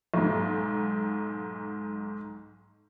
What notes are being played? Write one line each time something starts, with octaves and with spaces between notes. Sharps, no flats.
B1 G#2